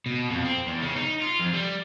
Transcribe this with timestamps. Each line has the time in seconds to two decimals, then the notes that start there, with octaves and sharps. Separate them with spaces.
0.06 B2
0.30 F2
0.45 C4
0.67 E2
0.82 C#3
0.96 D#4
1.22 F4
1.39 F2
1.53 G3